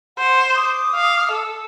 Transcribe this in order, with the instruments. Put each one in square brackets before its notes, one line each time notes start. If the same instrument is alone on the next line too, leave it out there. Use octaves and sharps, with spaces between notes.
[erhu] C5 [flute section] F#5
[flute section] D6 D#6
[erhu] F5
A4